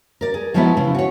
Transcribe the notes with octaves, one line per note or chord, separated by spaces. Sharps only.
A#4 D5
G#4
F3 F#3 G#3 B3 C#4 E4
C#3 E4
F#4 C#5